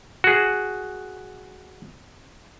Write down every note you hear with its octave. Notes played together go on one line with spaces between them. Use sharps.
F#4 G#4